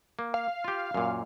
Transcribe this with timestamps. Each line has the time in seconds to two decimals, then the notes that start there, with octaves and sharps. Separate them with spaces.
0.19 A#3
0.34 F5
0.64 F4 G4
0.94 F#2 A#2